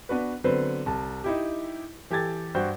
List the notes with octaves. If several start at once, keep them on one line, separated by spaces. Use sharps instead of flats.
B3 D4 F#4 B4
D3 F#3 B3 C4 B4 C5
C2 A5
D#4 E4 G4
E3 G4 A4 G#6 A6
G2 F#4 C5 G5 G6